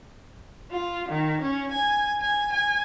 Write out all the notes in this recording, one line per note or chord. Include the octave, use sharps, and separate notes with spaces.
F4
D#3
C#4
G#5
G#5
G#5